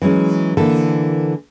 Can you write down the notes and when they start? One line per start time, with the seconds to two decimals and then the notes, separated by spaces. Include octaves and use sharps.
0.02 E3 F#3 G#3 C#4
0.57 D3 E3 A#3 A4